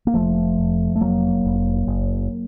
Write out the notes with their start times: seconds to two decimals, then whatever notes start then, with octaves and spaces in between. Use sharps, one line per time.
0.07 A#3
0.14 F1 F3 A3
0.58 F2
0.96 A3
1.01 F1 F#3 A#3
1.45 F1
1.87 F#1